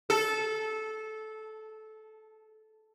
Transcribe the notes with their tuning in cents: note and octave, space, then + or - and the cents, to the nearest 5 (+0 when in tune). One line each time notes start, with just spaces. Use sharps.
A4 -15